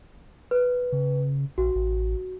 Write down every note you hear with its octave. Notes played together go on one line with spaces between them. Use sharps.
B4
C#3
A#1 F#4
A1